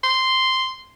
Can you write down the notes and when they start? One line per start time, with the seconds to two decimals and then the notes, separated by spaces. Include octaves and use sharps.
0.04 C6